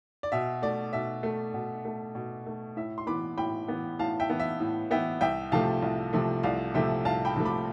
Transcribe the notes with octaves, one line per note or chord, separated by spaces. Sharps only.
D5
B2 E5
A3 D5
B2 E5
A3
B2
A3
B2
A3
A2 E5
C6
E3 B3 B5 D6
A2 G5 B5
E3 B3
A2 F5 A5
E5 G5
E3 B3
E5
A2
E3 B3 E5 G5
C2 E5 G5
C3 F3 A3 F5 A5
C2
C3 F3 A3
C2 D5 F5
C3 F3 A3 E5 G5
C2 F5 A5
G5 B5
C3 F3 A3
B5 D6